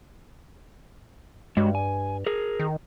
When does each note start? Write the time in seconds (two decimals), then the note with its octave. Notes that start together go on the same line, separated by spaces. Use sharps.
1.57 G2 G#3 F#4 C#5
1.75 G#5
2.26 G#4 A#4
2.60 D#3